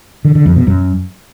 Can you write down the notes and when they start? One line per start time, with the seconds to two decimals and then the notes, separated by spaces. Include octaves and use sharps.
0.25 D3
0.35 D3
0.46 F2
0.56 B2
0.67 F#2